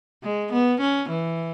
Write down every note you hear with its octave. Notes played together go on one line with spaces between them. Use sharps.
G#3
B3
C#4
E3